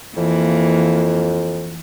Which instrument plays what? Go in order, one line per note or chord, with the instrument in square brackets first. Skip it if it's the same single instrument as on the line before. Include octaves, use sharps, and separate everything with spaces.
[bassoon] F2 [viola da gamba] E3 A#3